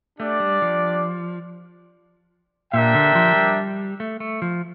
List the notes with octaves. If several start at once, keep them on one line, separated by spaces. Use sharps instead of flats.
A3 D4 G4 D5
G3
F3
A#2 D4 G4 A#4 E5 G5
D3
F3
G3
A3
A3
F3